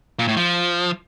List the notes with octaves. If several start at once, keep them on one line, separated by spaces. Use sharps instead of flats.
A#2
A2
F3